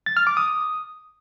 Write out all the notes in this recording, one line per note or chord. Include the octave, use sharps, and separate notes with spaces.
A6
F6
D6
D#6